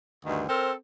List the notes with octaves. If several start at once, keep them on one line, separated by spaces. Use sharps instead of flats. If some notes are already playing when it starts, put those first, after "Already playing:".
D2 G2 D#3
C4 A4 A#4 C5